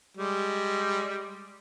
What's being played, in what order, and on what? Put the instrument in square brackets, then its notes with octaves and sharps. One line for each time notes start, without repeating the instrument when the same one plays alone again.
[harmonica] G3 G#3